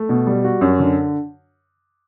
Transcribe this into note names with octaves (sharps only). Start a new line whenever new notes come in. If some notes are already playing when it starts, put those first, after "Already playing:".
Already playing: A3
B2
G3
F#4
F#2
D3